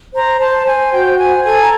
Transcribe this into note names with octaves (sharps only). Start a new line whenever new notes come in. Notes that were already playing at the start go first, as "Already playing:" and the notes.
C5 A#5
C5 A5
C5 G#5
F#4 G5
C5 G#5
A4 G#5
A#5